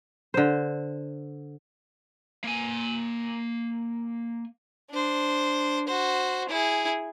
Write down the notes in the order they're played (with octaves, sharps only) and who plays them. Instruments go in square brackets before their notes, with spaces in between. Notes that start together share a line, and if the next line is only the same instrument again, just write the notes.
[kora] D3 C5
[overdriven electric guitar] A#3 G#5
[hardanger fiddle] D4 C5
F#4 C5
E4 G#4